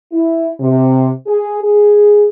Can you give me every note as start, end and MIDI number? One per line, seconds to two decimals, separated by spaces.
0.13 0.50 64
0.60 1.09 48
1.27 1.58 68
1.63 2.27 68